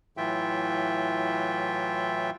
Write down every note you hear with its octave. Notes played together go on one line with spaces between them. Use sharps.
A2 E3 F#3 F4 E5 G5